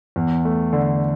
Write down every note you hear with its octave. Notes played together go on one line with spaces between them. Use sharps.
E2
A3
D3